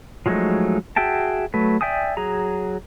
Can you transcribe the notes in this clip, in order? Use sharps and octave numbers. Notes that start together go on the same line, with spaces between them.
F3 F#3 G#3 A3 D#4
F#4 G#4 E5 G5 A5
F#3 A3 B4
D5 E5 G5 G#5 D#6
F#3 G#4 A#5